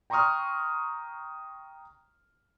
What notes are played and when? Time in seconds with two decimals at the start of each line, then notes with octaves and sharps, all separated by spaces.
0.10 G5 A#5 C6 C#6 D#6 F6